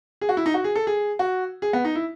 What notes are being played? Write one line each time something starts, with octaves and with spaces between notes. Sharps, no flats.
G#4
F#4
E4
D#4
F#4
G#4
A4
G#4
F#4
G#4
B3
D#4
E4